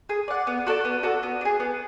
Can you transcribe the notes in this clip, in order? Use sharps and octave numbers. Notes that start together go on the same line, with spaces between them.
G#4
D5 F#5
B3
F#4 A4 D5
B3
F#4 A4 D5
B3
D4
G#4
B3